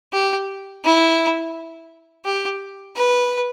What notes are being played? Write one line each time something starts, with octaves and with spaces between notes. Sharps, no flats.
G4
E4
G4
B4